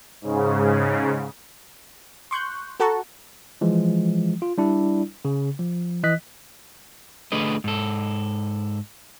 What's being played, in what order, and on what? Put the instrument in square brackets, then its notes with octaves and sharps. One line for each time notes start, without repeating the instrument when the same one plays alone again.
[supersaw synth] G#2 C#3
[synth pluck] C6 C#6 F#6 G6
F#4 A4 F#5 A5 A#5 C#6
[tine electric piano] E3 F3 G#3
F4
G3 D4 E4
C#3
F3
E3 D#5 F#6 B6
[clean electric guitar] D2 A3 D4 G#4 B4 D#5
G#2 A4